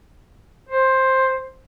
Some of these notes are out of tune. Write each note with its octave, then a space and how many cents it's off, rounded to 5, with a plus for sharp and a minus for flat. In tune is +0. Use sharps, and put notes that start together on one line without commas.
C5 +10